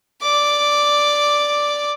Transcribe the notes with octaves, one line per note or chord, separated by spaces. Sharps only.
D5 D6